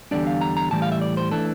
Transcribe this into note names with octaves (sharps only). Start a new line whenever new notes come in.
E2 D3 G3 D4 D5
F5
A#5
A#5
A2 E3 G3 A5
F5
E5
D5
C5
E3 A3 D4 A4